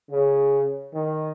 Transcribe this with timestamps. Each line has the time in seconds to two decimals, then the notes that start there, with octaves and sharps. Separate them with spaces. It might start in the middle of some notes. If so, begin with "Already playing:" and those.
0.10 C#3
0.94 D#3